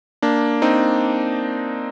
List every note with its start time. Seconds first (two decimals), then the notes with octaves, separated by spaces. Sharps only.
0.22 A#3 D4
0.62 C4 D#4